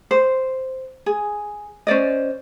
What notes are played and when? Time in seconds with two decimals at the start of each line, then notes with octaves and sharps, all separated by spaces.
0.11 C5
1.06 G#4
1.87 C#4 C5 D5 D#5